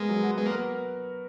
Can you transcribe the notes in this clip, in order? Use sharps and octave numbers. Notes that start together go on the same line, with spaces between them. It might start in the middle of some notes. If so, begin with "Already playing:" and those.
Already playing: G#3 B3 A#4
F#3
F#4
G#3 B3
A#3
A#4